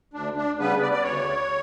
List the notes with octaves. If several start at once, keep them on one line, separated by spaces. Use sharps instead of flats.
D2 D4
D4
C#3 G3 B3 B4
D5
D5
D2 C#5